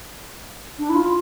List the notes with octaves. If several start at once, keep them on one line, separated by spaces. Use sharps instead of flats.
D4
E4
F4